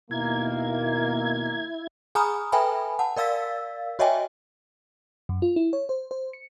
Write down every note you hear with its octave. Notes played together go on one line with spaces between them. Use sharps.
D#2 B2 D#3 A#3 E4 G#6
G#4 G#5 A#5 B5 D#6 F6
A4 B4 E5 G5 G#5 B5
F#5 A5
A#4 D5 F5 E6 A6 B6
F#4 C#5 D#5 E5 G5 G#5
F#2
F4
E4
C#5
C5
C5
C#7